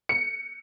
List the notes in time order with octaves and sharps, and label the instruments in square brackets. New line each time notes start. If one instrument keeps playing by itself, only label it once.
[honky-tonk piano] C#7